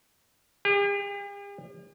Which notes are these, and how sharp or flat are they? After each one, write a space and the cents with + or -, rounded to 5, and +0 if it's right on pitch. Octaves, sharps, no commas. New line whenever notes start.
G4 +45